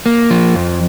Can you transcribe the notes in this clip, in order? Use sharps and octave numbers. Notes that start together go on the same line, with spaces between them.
A#3
F3
F2